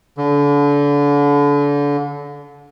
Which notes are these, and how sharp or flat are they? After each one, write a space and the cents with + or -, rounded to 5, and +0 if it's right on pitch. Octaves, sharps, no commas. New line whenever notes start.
D3 -30